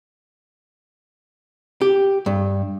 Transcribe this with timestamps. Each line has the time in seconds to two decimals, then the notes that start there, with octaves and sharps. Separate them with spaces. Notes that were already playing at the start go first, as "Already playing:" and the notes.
1.82 G4
2.26 G2